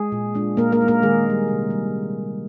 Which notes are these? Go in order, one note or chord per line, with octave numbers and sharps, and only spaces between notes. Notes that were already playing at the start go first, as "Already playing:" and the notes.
Already playing: G#3 G#4
A#2
G#3 D4 F4
A#2 A#3 A#4
A#3 A#4
G#3 D#4
A#3 A#4
D#3 G#3 G#4
G3 A#3
C3
G3